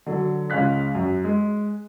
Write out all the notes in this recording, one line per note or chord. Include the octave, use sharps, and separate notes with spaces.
D3 F#3
C#2 G#3 C#4 F5 F#6 B6
F#2
G#3